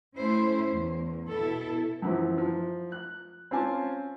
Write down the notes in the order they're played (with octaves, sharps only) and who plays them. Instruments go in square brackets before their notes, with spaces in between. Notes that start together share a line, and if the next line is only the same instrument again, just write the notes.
[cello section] A3 C#4 E4 C5
E2
B2 E4 A4
[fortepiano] F#2 E3 F3
F3
F#6
C4 C#4 F4 C5 G#5 A5